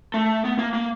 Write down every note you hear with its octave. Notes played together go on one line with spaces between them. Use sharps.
A3
B3
A#3
A#3